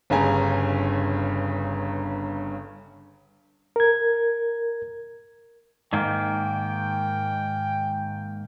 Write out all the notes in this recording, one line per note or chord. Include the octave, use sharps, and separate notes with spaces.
G1 G2 C#3 G#5 A#5
A#4 G#6
G#2 D#3 A#3 G5